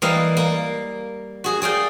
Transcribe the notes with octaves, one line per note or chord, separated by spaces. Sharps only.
E3 G3 A#3 D#5 F5
A#3
F#4 G#4
G#4 D5 F5 G5